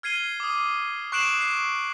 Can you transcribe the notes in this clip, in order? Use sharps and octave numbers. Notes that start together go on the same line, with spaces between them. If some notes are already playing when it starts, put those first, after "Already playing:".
F6 G#6 C7 D#7 G7
D6 D#6
C#6 F#6 C7 D7 E7 F#7
C7